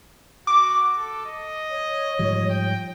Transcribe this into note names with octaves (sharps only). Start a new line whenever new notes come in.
F#4 D6
A4
D#5
C#5
G#2 F3 G3
G5